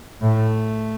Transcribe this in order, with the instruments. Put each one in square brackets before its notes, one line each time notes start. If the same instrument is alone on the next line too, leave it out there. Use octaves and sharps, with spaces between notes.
[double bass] A2 [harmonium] A3